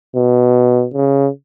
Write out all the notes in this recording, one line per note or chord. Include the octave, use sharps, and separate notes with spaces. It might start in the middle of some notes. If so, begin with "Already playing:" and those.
B2
C#3